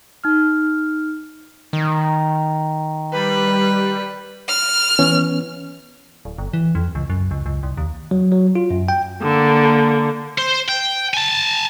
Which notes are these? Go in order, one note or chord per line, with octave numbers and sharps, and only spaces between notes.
D#4 F6
D#3
G3 B4
F6
E3 B3 C#4
D1
G1
E3
F2
C#2
F#2
C#2
C#2
C2
D#2
F#3
F#3
F4
F#2
G5
D3 A#3
C5
G5
G#5 A5